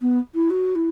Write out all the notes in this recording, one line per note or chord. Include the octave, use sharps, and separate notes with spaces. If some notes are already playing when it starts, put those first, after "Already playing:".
B3
E4
F#4
E4